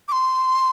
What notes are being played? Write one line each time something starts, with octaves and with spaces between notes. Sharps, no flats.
D6
C6